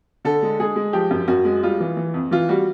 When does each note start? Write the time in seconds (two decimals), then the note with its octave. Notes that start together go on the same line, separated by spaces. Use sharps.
0.25 D3 A4
0.42 G#3
0.59 G#3 G#4
0.76 G#3
0.93 F3 G4
1.11 F#2
1.28 F#2 F#4
1.45 G#3
1.63 G3 F4
1.80 E3
1.97 E3
2.14 F2
2.31 E3 F4
2.49 G3 F#4